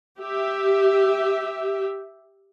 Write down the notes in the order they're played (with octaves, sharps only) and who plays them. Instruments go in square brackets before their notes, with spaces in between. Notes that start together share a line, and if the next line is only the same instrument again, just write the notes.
[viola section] G4 E5